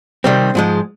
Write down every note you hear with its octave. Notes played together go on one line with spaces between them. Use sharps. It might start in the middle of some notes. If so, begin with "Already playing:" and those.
C3 D#3 G3 C4
G#2 F3 G#3